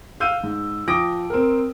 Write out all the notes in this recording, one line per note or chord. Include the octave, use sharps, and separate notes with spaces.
F5 E6 G6 D#7
G#2
F3 G5 D6 D#6 A#6 D7
C4 A#4